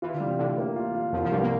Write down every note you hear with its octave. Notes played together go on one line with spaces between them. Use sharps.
E3 F4
D3
G3
C3
A2 D3
A#3
F4
F4
C2 F2 F3
F3
C2 G2 G3
A#3